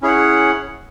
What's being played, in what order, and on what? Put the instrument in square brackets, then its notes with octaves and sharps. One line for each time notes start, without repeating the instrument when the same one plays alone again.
[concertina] C#4 E4 G#4 C#5 F#5